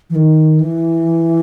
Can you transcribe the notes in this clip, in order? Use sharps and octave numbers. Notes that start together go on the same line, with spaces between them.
E3
D#3
E3